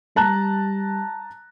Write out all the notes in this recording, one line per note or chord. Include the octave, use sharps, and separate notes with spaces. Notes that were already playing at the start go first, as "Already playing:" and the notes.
G3 A5 A#5 F#6